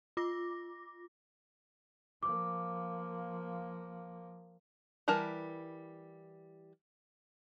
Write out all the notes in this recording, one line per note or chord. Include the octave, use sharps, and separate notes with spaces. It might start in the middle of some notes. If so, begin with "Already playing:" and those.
F4 D6 A#6
F3 A#3 D6
E3 G3 A#4 A5